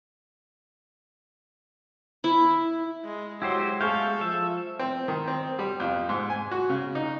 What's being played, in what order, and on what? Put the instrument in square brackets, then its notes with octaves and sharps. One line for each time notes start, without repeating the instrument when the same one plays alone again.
[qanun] E4
[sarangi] G#3
[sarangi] F#3 [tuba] G#3 [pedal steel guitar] E4 G4 C5
[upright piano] G#4 C#6 G6 [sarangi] A4 [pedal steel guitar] F5
[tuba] F3 [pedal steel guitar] E5
[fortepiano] C4
D#3
C4
G3
F2
G#2
G#5
F#4
C#3
D#4